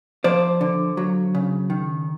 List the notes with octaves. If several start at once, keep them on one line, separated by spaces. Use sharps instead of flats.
F3 C5 D5
D3
F#3
C#3
D#3